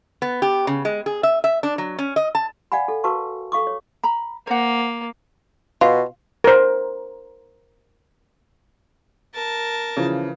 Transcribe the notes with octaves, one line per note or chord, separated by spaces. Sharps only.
B3
G4
C#3
G#3
G#4
E5
E5
D4
F#3
C#4
D#5
A5
D5 F5 F#5 G#5 B5
A4
F#4 A#4 B4 F5 A5 C#6
A4 F5 C#6 D6
C#5
A#5 B5
A#3 C5 F#5
B2 F4
A#4 C5
A#4 A5
C#3 E3 F3